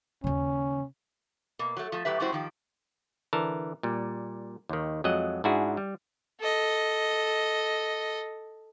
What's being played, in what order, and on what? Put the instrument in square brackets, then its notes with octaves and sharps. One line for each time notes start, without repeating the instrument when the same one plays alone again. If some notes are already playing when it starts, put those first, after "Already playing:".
[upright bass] D#2 C#3 [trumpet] C#4
[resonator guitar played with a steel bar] B2 A#3
F#3 A3
F3 A3
A2 F#3 G4 B4 E5
F2 G3 C#4 E4 F#4 C5
D#3 F3 G4
[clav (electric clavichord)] D3 E3 A#4 A5
A#2 G3
D#2 D#3
F2 F#3 G#3 D#5 F#5
G#2 D4 E4 F#4 G#4
G3
[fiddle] A4 D#5